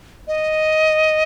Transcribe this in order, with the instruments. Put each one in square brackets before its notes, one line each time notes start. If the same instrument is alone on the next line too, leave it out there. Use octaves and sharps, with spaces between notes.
[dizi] D#5